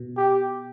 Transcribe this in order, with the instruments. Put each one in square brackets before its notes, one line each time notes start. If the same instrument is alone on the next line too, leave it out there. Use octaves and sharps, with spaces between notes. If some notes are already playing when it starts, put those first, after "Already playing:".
Already playing: [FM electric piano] B2
[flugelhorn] G4